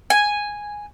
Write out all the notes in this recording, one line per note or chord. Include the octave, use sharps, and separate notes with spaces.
G#5